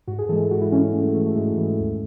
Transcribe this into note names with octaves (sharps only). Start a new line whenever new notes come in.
G#2 F#4
G#4
E3 G#3 A4
G#2 F#4
E4
E3 G#3 C#4
C#4
G#2 A3
A3
E3 G#3 A3
A3
G#2 G#3
E3 G#3
D#2